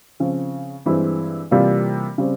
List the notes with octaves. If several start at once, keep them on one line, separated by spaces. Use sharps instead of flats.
C#3 F3 C4
G2 E3 G#3 C4 E4
C3 E3 G3 A#3 F4
C#3 G3 C4